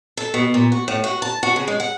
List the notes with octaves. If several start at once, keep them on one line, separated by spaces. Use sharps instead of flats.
A4
B2
A#2
F#4
A2
F#4
A5
F#4
C#3
G#3
F#5